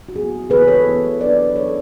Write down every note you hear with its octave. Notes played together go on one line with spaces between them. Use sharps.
F#4
F#3 B3 E4 G#4
E3 B3 E4 G#4 B4
A4 C#5
E3 B3 E4
F#3 B3 D4 B4 D5
F#3 B3 D4 A4 C#5